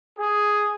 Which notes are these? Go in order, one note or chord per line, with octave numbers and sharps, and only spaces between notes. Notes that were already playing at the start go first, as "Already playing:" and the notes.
G#4